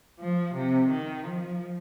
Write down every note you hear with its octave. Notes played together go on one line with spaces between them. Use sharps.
F3
C3
D#3
F3